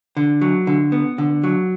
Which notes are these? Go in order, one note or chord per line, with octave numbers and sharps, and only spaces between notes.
D3
F#3
D3
B3
D3
F#3